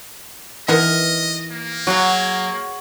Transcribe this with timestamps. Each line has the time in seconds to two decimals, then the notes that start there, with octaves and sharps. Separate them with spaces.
0.68 E3 B3 D#4 A#4 D#5
1.51 A#3
1.87 F#3 F#4 G#4 F5